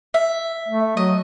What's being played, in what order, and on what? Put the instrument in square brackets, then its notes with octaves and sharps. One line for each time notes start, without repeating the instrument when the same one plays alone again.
[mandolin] E5
[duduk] A3
[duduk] F#3 [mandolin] D#5